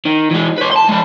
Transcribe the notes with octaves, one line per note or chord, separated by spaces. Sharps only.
D#3
E3 G#3
B4 C#5
A5 C6
G#3 D5